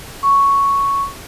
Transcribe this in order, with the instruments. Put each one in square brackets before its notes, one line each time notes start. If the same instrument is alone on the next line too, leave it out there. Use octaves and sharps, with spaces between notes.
[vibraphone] C#6